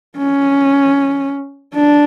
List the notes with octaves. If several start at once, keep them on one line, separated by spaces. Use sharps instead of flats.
C#4
D4